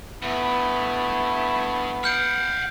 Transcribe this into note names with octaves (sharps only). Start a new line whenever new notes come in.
G2 A3 B3 E4
F5 F#5 F6 G6 D7